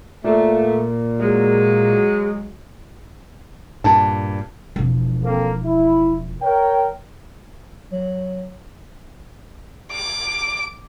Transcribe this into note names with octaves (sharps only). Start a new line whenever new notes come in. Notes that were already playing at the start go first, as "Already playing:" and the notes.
A#2 A3
F#3 G#3
G2 A#2 A5
E1 F3
A#3 C4 A4
E4
A#4 C#5 G5
F#3
D6